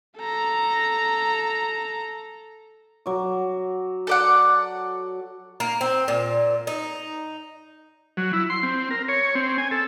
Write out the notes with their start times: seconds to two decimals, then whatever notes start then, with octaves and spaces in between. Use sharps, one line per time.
0.18 A4 A#5
3.06 F#3 D6
4.07 A4 D5 F#5
5.60 A#3
5.81 C4
6.08 A#2
6.67 D#4
8.17 F#3
8.33 E4
8.50 C6
8.63 C4
8.91 A#4
9.09 C#5
9.35 C4
9.58 G#5
9.71 A4